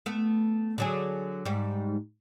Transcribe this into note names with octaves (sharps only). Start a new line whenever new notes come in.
A3 B3
D3 F#3 G#4
G#2 G3